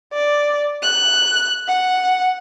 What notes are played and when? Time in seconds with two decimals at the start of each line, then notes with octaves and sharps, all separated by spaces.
0.13 D5
0.83 F#6
1.68 F#5